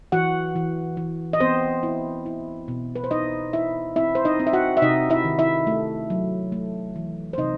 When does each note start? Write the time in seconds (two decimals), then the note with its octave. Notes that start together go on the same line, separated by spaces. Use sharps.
0.12 E3 F#4 F#5
0.56 E3
0.97 E3
1.33 D#5
1.40 B3 C4 C5
1.83 E4
2.26 E4
2.68 B2
2.96 B4
3.04 C5
3.11 D#4 E4 D#5
3.53 E4 E5
3.96 C4 E4 E5
4.15 C5
4.25 D#4 D#5
4.40 C4
4.47 E5
4.53 F#4 F#5
4.77 E5
4.82 C3 D#4 D#5
5.10 E4 E5
5.24 D#3
5.39 E4 E5
5.67 A3
6.10 F#3
6.52 A3
6.96 E3
7.33 C5
7.38 C3 D#4 D#5